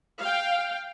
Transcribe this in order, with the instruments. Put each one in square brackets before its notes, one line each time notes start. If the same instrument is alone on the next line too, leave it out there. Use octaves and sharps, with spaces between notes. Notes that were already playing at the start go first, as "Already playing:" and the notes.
[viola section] F5 G5